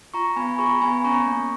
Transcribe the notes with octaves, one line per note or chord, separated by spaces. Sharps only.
F4 A#5 C#6
B3 G#5 B5
B5
G#4 A#5 C#6
B3 G#5 B5
C#4 A#5 C#6
A#3